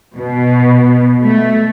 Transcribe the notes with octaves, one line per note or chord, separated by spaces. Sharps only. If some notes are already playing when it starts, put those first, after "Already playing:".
B2
A3